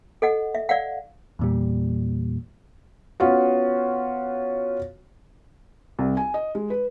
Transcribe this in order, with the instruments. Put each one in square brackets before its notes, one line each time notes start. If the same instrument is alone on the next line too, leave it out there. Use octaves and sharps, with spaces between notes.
[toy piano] A4 D#5 F#5
E5
D5 F5 F#5
[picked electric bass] E2 A#2 G3
[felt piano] B3 C#4 F4 F#4
C2
G#5
D#5
G#3
B4